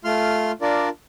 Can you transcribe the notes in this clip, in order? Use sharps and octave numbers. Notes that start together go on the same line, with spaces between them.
A3 F4 C6 F6
D4 F4 A#4 D5